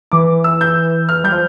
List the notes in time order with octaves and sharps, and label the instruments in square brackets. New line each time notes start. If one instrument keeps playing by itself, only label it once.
[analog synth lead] E3 [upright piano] D6
[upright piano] E6
G6
F6
[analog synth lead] G3 [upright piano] G6
[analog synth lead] F3